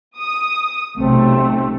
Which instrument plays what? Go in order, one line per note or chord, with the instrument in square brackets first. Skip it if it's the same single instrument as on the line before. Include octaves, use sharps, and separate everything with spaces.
[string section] D#6
[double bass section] B1 C3 [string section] A3 [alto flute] C4